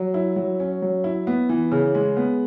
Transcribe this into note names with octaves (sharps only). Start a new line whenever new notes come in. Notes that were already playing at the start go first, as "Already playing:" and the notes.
Already playing: F#3
E4
F#3
C#4
F#3
E4
B3
E3
C#3
G#3
B3